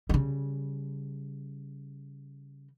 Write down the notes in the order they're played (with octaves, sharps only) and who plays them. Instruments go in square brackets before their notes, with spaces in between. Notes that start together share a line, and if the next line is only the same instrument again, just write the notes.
[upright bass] C#3 G3